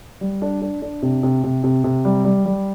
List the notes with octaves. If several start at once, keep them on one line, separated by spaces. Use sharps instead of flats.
G3
D4
D4
D4
C3
C3
C3
C3
C3
G3
G3
G3